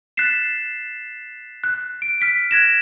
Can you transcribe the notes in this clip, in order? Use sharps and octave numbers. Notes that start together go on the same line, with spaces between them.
F#6 A6 B6 C7 E7
F#6
D7
F6 B6 D7
F#6 G#6 A#6 E7